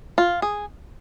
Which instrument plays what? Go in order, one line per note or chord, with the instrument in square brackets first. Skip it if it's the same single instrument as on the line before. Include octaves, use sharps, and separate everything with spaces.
[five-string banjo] F4
G#4